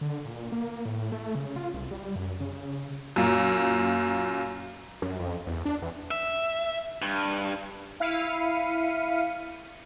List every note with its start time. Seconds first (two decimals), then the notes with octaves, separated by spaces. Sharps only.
0.01 D3
0.25 A#2
0.52 A#3
0.86 A2
1.12 A3
1.35 C#3
1.56 F4
1.74 C2
1.91 G3
2.16 F#2
2.40 C#3
3.16 F#2 A#2
5.02 F#2
5.19 F2
5.46 E2
5.65 D4
5.82 E2
6.11 E5
7.02 G2
8.00 E4 F5 B6 C#7 D#7